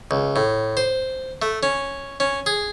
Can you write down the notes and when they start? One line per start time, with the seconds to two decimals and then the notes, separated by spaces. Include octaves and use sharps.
0.11 C#2
0.36 A2
0.77 C5
1.42 A3
1.63 C#4
2.20 C#4
2.46 G#4